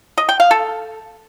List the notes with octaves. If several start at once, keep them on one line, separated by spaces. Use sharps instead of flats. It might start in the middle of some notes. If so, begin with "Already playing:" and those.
D#5
G5
F5
A4